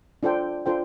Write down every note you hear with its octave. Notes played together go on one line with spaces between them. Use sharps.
D4 F4 A4 C5 G5
D4 F4 A4 C5 G5